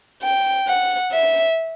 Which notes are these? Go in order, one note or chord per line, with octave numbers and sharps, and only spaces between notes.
G5
F#5
E5